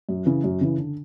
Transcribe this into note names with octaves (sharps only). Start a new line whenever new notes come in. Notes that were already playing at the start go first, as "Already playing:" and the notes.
F#2
C#3 E3
F#2
C#3 E3
D3